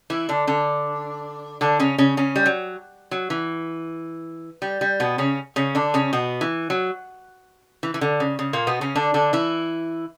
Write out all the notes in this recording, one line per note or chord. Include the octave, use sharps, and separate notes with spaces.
E3 E4
D3 D4
D3 D4
D3 D4
C#3 C#4
C#3 C#4
C#3 C#4
G3
F#3
F#3
E3
G3
G3
B2 B3
C#3 C#4
C#3 C#4
D3 D4
C#3 C#4
B2 B3
E3
F#3
E3
E3
D3
C#3
C#3
A#2 A#3
B2 B3
C#3 C#4
D3 D4
D3 D4
E3 E4